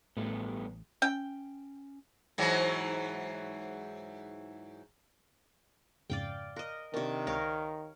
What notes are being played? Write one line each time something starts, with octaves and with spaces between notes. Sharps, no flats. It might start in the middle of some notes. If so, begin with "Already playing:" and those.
A1 G2 A3 B3
C#4 G5
G#2 E3 F#3
F2 G#2 C#3 D5 F5 G5
A#4 D#5 F5 C6 F#6
C3 D#3 D4 A#4 F5 C#6
C#2 A#4 C#5 E5 F5 G#6